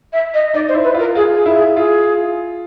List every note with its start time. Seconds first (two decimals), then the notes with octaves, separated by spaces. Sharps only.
0.13 E5
0.34 D#5
0.54 D#4 D5
0.69 C5
0.75 E4
0.84 B4
0.94 F4 A#4
1.15 F4 G#4
1.36 G#4
1.46 E4
1.56 G#4
1.76 F4 G#4